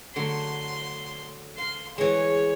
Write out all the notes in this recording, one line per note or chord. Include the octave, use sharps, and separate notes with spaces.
D3 F#3 A3 C6
F5 C6
E3 G#3 C#5